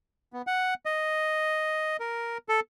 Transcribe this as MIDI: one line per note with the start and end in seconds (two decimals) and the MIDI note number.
0.33 0.42 59
0.47 0.74 78
0.85 1.97 75
2.00 2.38 70
2.49 2.60 69